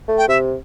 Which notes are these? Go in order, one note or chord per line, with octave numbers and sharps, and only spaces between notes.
A3
G5
C3 E5